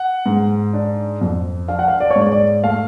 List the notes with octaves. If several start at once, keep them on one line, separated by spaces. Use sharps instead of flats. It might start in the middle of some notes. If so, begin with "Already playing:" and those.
Already playing: F#5
G#2
D4
F2
D4 F5
F#5
F5
D5
C#5
G#2
D5
D5
A3 F5